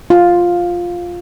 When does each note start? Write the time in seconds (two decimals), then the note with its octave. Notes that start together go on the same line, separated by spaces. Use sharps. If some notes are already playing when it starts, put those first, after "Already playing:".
0.10 F4